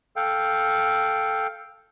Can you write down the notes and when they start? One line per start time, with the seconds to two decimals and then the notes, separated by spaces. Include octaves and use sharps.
0.16 A4 F5 G5